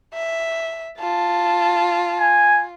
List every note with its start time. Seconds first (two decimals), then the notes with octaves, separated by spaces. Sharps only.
0.14 E5
1.00 F4 A5
2.20 G#5